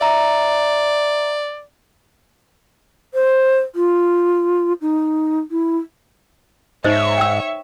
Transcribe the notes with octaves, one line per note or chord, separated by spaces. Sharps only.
D5 E5 A#5
C5
F4
D#4
E4
G#2 D#4 C5 C#5 D#5 E5
G5 E6